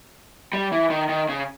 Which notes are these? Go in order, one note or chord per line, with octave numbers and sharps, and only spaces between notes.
G3
E3
D#3
D#3
C#3